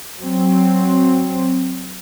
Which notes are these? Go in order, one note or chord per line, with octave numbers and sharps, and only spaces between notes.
F#3 C4